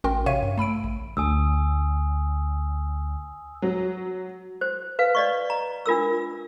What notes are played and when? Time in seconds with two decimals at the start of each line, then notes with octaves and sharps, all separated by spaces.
0.04 A1 C#4 F#4 A#4 G5 C6
0.26 C3 C#5 E5 F5 C#6 D#7
0.43 G2
0.58 A3 B5 E6 D7
0.84 A1
1.17 D2 G#5 D#6 E6
3.62 F#3
4.61 C5
4.99 B4 F5
5.15 D5 D#5 C#6
5.50 A#5
5.86 D4 F4 A#4 E6